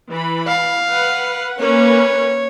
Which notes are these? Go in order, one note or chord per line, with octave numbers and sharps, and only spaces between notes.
E3 B5
F5
B4 F#5
A#3 C#4 B4 C#5